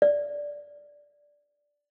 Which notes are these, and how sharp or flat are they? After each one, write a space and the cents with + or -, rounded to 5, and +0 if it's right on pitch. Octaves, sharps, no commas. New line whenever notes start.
D5 -5